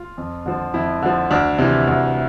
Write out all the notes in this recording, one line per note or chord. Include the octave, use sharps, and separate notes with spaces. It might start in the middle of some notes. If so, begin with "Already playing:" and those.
Already playing: F4
F2
D3 F3
F2 E4
D3 F3
D2 D4
C3 E3
D2